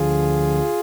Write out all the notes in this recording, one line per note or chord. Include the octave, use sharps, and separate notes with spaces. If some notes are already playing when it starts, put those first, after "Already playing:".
Already playing: D2 D3 F3 F4 G#4